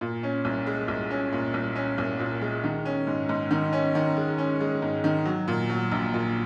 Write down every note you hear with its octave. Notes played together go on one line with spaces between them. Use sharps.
A#2
C#4
C2
G#3
C2
C#4
A#2
C2
C#4
C2
A#2
G#3
D#3
C#4
G#2
G#2
D#3
C#4
D#3
G#3
C#4
G#3
G#2
D#3
F#3
A#2
F#3
A#1
A#2